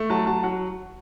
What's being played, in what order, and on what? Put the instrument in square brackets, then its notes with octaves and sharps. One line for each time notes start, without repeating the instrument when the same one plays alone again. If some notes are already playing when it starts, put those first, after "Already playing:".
Already playing: [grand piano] A3
F#3 A5
F#3 A5
F#3 F#5